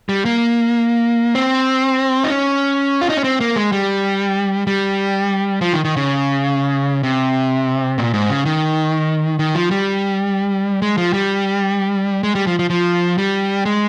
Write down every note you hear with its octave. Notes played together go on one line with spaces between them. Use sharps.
G3
A#3
C4
D#4
C#4
F4
D#4
C#4
C4
A#3
G#3
G3
G3
F3
D#3
D#3
C#3
C3
A#2
G#2
C#3
D#3
D#3
F3
G3
G#3
F3
G3
G#3
G3
F3
F3
F3
G3
G#3